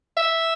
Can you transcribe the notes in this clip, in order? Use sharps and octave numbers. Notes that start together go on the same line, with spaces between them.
E5